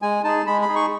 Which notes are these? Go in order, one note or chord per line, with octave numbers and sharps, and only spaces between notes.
G#3 G#5
D#4 G#4 A5
G#3 B5
B5
D#4 G#4
C#6